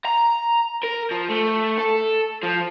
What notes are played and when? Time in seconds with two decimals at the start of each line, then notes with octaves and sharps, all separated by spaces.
0.05 A#5
0.83 A#4
1.11 F3
1.29 A3
1.78 A4
2.43 F3